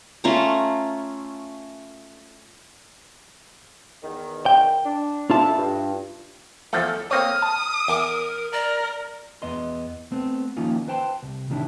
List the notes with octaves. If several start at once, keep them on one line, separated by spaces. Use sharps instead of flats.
A3 C#4 F4 A#5
E2 D#3
G5
D4
F2 A3 D4 E4 F4 A5
G2
E2 F3 A3 A4
A#3 C4 C#5 D#6 F6
A5
E2 A#4
A#4 D5
E2 B3 D#5 C6
A3 B3 C4
D#3 F3 A#3 C#4 D#4 F4
B4 C5 G5 A5 A#5 C6
C2
A2 C3 D#3 E3 D4 E4